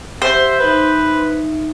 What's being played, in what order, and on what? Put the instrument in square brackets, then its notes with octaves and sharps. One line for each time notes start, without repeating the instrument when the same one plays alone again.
[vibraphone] G4 F#5 [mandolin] C5 [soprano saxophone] E5
[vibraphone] D#4 E5 [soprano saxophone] B4